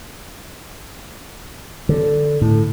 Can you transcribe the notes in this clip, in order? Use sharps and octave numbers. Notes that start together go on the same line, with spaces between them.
D3
A2